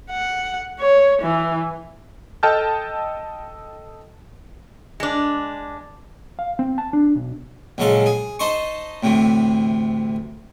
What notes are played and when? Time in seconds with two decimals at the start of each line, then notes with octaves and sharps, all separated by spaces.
0.10 F#5
0.80 C#5
1.22 E3
2.43 A4 D#5 G5 A5 F6 G6
5.00 G#3 D4
6.39 F5
6.59 C4
6.78 A5
6.93 D4
7.15 B1
7.78 A#1 C#3 F#3 G#3 A4 F5
8.06 G#4
8.39 D#4 C5 D#5 A5 C6 C#6
9.03 D2 A2 C3 E3